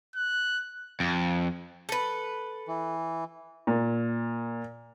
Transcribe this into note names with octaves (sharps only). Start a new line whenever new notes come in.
F#6
F2
A4 B4
E3
A#2